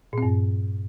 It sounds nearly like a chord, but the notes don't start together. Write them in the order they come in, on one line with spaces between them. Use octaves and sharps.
A#2 C4 G2